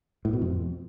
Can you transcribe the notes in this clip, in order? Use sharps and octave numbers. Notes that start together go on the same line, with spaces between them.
A2
B2
F2